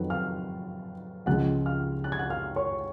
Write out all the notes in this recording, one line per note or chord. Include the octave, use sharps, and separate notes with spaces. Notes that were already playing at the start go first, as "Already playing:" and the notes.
Already playing: F2 D#3 F#3 B4
F5 F6
C#2 C#3 F3 G#3 F#5 F#6
F5 F6
F#6
G#6
F#5 F#6
F5 F6
C#5 C#6